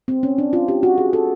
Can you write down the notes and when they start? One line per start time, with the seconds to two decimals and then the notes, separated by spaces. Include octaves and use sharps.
0.08 C4
0.23 C#4
0.38 D4
0.53 F4
0.68 G4
0.83 F#4
0.98 G#4
1.13 A4